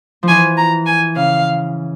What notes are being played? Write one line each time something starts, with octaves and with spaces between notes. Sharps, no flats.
F3
E3 G#5
A#5
G#5
C#3 F5